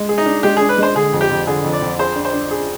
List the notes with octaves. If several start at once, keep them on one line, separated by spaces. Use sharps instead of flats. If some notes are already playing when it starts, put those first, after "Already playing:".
Already playing: G#3
G#4
D#4
D4
G#3 G4
G#4
D4
B4
G#3 C5
D3 G#4
F2
G4
F2
D3 G#4
F2
D5
F2
G#4 C5
D4
C5
D4
G#4